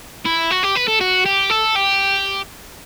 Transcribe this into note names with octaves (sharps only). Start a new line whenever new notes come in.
E4
F#4
G4
B4
A4
F#4
G4
A4
G4